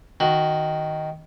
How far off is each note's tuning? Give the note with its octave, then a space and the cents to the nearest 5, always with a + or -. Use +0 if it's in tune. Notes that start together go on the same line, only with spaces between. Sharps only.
D#3 +0 F#4 +0